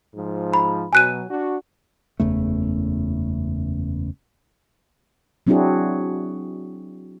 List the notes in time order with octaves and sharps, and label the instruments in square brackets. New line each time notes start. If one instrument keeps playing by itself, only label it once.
[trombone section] G#2 F3
[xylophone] A#5 B5
[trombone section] B2 F#3 [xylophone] G#5 F#6 D#7
[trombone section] D4 F#4
[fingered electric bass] F#1 E2 C#3 A3
[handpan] F#3 C4 D4 E4 F#4 G#4